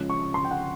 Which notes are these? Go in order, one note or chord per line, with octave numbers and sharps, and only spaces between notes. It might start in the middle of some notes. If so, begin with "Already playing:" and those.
Already playing: C#3 F3 G#3 C#4
C#6
C6
G5
F#5